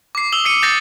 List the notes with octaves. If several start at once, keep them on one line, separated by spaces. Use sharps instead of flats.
D6 C7
D#6 E6 F#7 G7
D#6 C7 C#7 D#7
D#6 G6 A6 A#6 C7